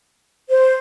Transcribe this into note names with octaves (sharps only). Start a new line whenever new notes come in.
C5